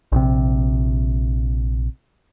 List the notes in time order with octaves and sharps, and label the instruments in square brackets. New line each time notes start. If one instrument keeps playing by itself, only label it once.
[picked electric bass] A#1 C3